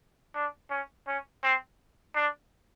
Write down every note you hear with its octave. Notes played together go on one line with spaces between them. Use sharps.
D4
C#4
C#4
C4
D4